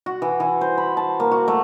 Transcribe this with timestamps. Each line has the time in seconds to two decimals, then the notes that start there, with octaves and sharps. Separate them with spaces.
0.06 F#4
0.22 E3
0.40 E3
0.61 C5
0.78 B5
0.97 A5
1.20 A#3
1.31 F#4
1.48 A3